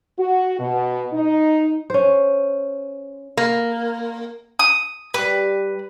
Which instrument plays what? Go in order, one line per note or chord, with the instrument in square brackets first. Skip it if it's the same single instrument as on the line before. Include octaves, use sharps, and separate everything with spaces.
[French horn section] F#4
B2
D#4
[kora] C#4 C5
[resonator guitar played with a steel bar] A#3
[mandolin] D#6
[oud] G3 G4 [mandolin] B4